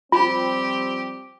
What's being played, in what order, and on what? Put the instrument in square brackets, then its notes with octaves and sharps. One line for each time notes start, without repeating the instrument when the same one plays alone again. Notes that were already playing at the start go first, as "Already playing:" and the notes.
[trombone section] F3 G3 C4 [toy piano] F4 [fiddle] G4 [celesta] B5